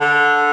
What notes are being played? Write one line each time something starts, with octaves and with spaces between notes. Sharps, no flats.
D3